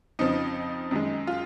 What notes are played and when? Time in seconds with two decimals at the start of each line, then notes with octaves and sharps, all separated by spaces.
0.19 F2 C#3 F3 D#4
0.91 F#2 D#3 G#3
1.27 F4